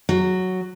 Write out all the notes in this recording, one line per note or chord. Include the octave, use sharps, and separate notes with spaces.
F#3